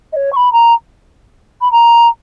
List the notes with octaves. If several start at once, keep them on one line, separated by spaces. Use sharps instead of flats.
D#5
C#5
C#6
B5
A#5
B5
A#5